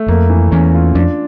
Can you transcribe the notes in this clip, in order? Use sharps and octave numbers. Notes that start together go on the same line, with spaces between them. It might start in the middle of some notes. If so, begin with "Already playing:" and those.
Already playing: A3
F2 A#3
E3
E2 C#4
F4
F2 D4